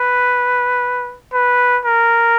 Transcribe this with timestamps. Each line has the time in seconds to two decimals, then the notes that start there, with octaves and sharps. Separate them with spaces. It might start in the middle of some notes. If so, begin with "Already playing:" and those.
Already playing: B4
1.33 B4
1.85 A#4